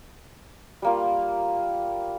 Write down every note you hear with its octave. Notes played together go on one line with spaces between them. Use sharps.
G3 A#3 F4